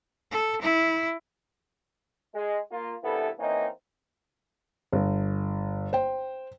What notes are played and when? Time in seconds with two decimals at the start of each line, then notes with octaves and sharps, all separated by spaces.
0.31 A4
0.62 E4
2.35 G#3
2.72 A#3 F4
3.04 C2 G2 E3 B3 E4 A4
3.39 E3 A#3 C4 C#4 D#4
4.93 G1
5.93 C5 G5